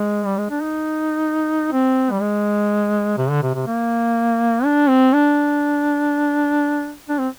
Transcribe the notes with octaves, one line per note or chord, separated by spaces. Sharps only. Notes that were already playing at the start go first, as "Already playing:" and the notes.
Already playing: G#3
G3
G#3
D4
D#4
C4
G3
G#3
C3
D3
C3
C3
A#3
D4
C4
D4
D4
C4